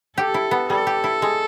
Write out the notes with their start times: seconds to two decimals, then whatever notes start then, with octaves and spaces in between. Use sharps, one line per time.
0.17 G4 A4
0.34 E4
0.51 B3
0.69 G3 A4
0.87 G4
1.04 E4
1.22 G#3